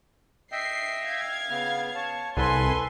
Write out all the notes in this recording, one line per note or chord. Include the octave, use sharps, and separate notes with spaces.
D#5 E5 G5 C7
F5 G#6
C#3 B3
C#5 A5
C2 A4 B4 G#5 C6